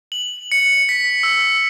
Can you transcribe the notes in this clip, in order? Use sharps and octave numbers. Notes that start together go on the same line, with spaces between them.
F#7
C#7
B6
E6